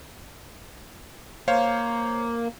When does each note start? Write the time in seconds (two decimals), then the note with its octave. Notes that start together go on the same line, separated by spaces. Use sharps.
1.48 A#3 C5 C#5 F5